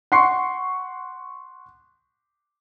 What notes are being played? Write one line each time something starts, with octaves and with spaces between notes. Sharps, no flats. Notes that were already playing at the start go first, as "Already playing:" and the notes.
F#5 C6 C#6 C7